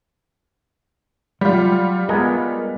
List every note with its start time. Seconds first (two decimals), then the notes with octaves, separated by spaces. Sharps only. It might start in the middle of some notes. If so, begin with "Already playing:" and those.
1.41 F#3 G3 F4
2.09 G#3 B3 A#4 A#5